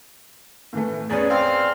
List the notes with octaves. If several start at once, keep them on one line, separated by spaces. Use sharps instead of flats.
A2 E3 A3
E2 B3 C#4 G#4 D5
C4 F5 F6